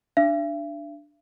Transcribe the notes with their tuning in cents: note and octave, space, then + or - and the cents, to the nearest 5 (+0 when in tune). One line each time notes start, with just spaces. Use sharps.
D4 +10 E5 +45